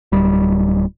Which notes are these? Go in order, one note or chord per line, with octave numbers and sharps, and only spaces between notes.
D1 G3